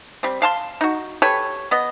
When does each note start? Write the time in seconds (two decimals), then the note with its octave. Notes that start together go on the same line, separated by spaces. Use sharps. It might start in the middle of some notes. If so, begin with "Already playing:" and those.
0.23 G3 C4
0.42 F5 A5 C6
0.81 D#4 F#4
1.22 G4 A4 B4 C#5
1.71 B3 D#5